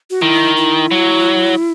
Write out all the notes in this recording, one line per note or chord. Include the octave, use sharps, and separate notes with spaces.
F#4
D#3 E4
E4
F#3